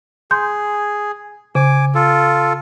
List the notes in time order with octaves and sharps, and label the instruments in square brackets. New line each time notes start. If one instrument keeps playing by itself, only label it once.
[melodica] G#4 [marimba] C6 G6
[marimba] C#3 [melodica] G#5 D6
[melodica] F4 A4